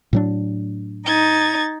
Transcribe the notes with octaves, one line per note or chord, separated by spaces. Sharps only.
A2 F#3 D4
D#4 G#6 A6